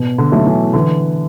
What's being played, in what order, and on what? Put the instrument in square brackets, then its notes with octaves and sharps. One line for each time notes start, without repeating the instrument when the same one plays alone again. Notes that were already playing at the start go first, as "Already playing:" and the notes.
Already playing: [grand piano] B2
[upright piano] D3
[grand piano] F#3 A3 E4 A4
[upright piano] E3
[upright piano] D3 [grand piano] E3